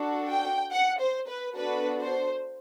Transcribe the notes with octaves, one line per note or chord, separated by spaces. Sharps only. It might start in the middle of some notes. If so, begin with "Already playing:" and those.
Already playing: D4 F#4 A4
G5
F#5
C5
B4
B3 D4 F#4 A4 B4
C5